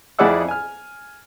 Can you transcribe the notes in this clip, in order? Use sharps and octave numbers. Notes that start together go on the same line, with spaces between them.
F2 E4 G#4 D5 F#5 E6
G#5 F6